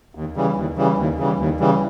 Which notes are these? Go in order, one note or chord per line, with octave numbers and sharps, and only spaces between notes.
D#2
C#3 E3 G3
D#2
C#3 E3 G3
D#2
C#3 E3 G3
D#2
C#3 E3 G3